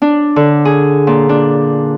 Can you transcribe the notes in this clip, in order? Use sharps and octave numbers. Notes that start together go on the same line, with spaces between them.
D4
D3
G#4
A#2
D4